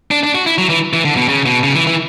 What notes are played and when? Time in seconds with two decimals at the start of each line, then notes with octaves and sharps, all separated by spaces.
0.11 D4
0.23 D4
0.35 F#4
0.46 E4
0.58 F#3
0.70 E3
0.93 E3
1.05 D3
1.17 B2
1.29 C#3
1.46 B2
1.64 C#3
1.75 E3
1.87 E3